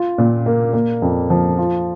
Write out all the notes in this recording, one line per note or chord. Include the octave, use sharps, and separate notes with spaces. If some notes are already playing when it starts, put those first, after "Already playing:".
Already playing: F4
A#2
A#3
A#3
F2
F3
F4